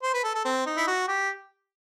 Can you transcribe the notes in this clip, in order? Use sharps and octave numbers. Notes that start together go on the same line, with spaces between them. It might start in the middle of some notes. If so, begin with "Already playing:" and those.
C5
B4
A4
A4
C4
D#4
E4
F#4
G4